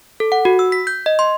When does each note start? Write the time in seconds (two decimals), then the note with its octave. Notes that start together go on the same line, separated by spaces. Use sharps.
0.20 A4
0.32 F#5
0.45 F#4
0.59 E6
0.72 B6
0.87 G6
1.06 D#5
1.19 C6